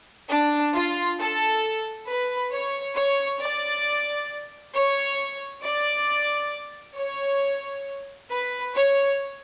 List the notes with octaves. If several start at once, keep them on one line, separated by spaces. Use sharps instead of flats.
D4
F4
A4
B4
C#5
C#5
D5
C#5
D5
C#5
B4
C#5